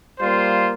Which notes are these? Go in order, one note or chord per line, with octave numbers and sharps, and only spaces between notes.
G3 A#3 F4 C5